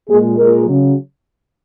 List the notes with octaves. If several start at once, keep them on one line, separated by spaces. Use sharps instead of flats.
A#2 G#3 G#4
A#2 G#3 A#4
C#3 F#3